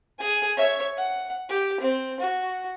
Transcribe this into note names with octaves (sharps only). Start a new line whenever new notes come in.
G#4 G#5
C#5 E5
F#5
G4
C4
F#4